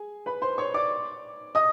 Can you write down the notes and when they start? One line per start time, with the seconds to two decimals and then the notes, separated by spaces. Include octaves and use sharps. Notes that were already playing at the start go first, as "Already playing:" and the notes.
Already playing: G#4 G#5
0.26 B4 B5
0.42 C5 C6
0.58 C#5 C#6
0.74 D5 D6
1.55 D#5 D#6